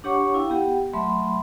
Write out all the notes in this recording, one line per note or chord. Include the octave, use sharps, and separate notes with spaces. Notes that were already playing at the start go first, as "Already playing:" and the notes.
D4 G4 C#5 F#5 C#6 D6
E4 F5 G5
B3 G4 F#5 G5
F#3 A3 E5 B5 C6